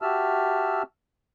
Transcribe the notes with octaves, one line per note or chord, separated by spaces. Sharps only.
F#4 G4 E5 A5 E6 F6